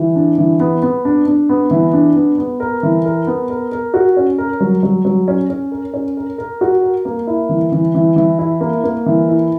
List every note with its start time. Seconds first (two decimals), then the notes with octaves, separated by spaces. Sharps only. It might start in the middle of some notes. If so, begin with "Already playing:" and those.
Already playing: E3
0.16 D4
0.38 E3
0.60 B3
0.82 B3
1.05 D4
1.27 D4
1.49 B3
1.71 E3
1.93 D4
2.16 B3
2.38 B3
2.60 A#4
2.83 E3
3.05 A#4
3.27 B3
3.50 A#4
3.72 A#4
3.94 F#4
4.17 C#4
4.38 A#4
4.61 F#3
4.83 F#3
5.05 F#3
5.28 C#4
5.50 C#4
5.71 A#4
5.94 C#4
6.17 A#4
6.38 A#4
6.61 F#4
6.83 A#4
7.05 A#3
7.27 E4
7.49 E3
7.72 E3
7.95 E3
8.16 E3
8.39 E4
8.61 A#3
8.84 A#3
9.06 E3
9.28 E4